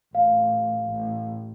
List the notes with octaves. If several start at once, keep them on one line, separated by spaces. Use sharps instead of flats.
A1 F5
A1